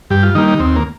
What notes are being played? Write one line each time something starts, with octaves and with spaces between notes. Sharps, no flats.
G2 G4
F4
D#3 G3 A#3 D#4
D#4
D#2 C4
A#3